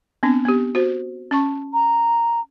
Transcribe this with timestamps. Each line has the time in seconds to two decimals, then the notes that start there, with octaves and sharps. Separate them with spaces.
0.23 B3 C4 D4
0.45 B3 G4
0.75 F#4 C5
1.31 C#4 A5 C#6
1.73 A#5